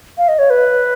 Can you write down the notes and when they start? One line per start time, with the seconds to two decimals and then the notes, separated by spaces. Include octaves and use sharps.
0.18 F5
0.28 D#5
0.39 C#5
0.50 B4